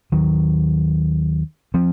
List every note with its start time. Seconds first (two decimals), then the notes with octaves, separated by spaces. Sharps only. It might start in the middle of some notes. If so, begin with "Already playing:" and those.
0.12 D#2 D#3 F#3
1.74 F3 C4